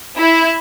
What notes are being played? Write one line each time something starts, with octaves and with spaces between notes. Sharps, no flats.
E4